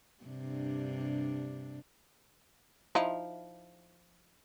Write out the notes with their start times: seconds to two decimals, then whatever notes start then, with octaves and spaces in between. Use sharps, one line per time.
0.24 G2 C3 D4
2.95 F3 D#4 E4